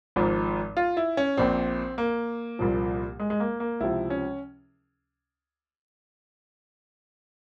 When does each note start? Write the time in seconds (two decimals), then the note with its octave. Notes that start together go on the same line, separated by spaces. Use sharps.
0.16 G#1 G#2 F3
0.77 F4
0.97 E4
1.17 C#4
1.37 A#1 A#2 F3 C4
1.98 A#3
2.59 C2 A#2 F3
3.20 G#3
3.30 G#3
3.40 A#3
3.60 A#3
3.80 C#2 C3 F3 E4
4.10 C#4